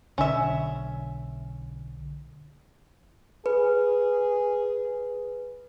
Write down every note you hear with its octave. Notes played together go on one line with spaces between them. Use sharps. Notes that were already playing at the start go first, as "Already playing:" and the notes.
B1 D3 C#4 E5
G#4 B4